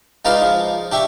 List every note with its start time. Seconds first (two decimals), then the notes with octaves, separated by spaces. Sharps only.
0.25 G#3 D#4 F4 B4 D5 F5
0.42 F3
0.92 D4 G4 E5 C#6